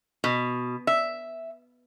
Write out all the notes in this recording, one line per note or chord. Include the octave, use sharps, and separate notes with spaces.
B2
E5